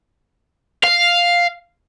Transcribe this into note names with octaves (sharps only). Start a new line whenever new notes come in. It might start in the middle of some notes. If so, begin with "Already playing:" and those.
F5